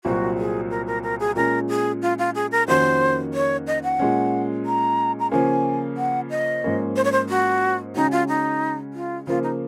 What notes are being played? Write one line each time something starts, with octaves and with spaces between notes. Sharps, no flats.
C2 A#2 F#3 C4 F#4
G#4
A#4
A#4
A#4
G#4
A#2 G#3 C#4 A#4
G#4
F4
F4
G#4
A#4
F2 D#3 A#3 C#4 F#4 C5
C#5
D#5
F#5
A#2 G#3 C#4
A#5
A#5
C#3 F3 A#3 C#4 G#5
F#5
D#5
G#2 F3 A#3 C#4
C5
C#5
C5
F#4
C#3 G#3 C#4 D#4 F#4
F4
D#4
F4
C#3 F3 A#3 F4
D#4